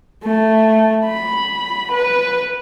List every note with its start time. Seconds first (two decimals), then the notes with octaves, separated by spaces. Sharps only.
0.23 A3
1.05 B5
1.91 B4